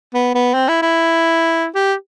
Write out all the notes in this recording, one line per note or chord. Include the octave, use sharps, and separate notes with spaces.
B3
B3
C4
E4
E4
G4